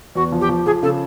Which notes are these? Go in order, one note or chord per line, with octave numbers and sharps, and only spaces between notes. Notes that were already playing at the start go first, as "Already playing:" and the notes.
E2 F#4
F3
G4
F3
F3 G#4
C#3 A4